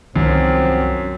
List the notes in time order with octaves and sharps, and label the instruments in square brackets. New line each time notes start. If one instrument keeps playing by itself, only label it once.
[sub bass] C2 [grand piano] F#2 [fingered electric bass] D#3 [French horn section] F3 C4 F#4